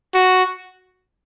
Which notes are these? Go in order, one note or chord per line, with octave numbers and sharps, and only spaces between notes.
F#4